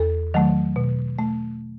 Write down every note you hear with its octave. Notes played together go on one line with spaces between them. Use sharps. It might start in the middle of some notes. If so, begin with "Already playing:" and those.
Already playing: E2 A4
D#3 F#3 A3
B2
A3